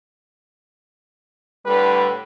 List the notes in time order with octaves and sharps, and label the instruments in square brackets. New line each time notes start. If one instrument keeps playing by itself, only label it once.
[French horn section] A2 D3 G3 [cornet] B4